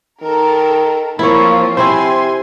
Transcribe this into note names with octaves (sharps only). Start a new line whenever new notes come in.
D#3 A4 A#4
F3 A#3 C4 E4 F4 C#5
C3 C4 E4 C5 G#5 C6